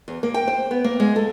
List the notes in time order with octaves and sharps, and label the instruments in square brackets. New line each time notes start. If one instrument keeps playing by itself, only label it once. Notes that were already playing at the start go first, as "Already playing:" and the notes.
[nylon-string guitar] E2
A#3
G5
C5
B3
A#3
G#3
A4